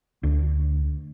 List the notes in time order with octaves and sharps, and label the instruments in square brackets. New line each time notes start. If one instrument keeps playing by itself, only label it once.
[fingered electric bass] D2 D4